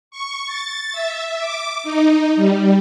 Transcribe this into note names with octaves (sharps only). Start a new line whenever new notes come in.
C#6
A6
E5
D6
D#4
G3